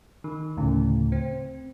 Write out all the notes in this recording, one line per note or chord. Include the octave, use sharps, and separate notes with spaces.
D#3
D2 A2 C#3
C4